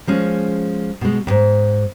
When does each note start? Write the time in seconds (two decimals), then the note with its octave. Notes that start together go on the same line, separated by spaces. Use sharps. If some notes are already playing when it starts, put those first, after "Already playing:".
0.07 F3 G#3 C#4
1.01 B2 G#3
1.27 D#2 G#2